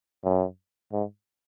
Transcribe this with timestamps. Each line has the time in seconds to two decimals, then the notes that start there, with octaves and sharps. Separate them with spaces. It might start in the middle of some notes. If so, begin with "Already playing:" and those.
0.24 F#2
0.93 G#2